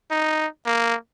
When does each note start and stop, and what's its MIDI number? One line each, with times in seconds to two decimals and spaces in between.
0.11 0.47 63
0.66 0.95 58